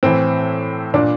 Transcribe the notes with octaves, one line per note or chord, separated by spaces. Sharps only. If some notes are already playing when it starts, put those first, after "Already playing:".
A2 E3 C4
A#2 D4